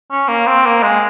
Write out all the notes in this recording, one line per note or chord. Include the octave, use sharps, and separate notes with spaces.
C#4
A#3
C4
A#3
G#3